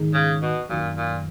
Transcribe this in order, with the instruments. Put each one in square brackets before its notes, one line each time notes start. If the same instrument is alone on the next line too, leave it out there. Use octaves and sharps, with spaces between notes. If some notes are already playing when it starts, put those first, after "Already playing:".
Already playing: [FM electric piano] G#2 D#3 G#3 D#4
[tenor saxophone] C#3
B2
[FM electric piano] F#2 D#3 F#3 [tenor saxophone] A#2
[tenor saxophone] A#2